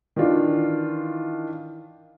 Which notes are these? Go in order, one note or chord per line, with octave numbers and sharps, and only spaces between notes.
D#3 E3 D4 F4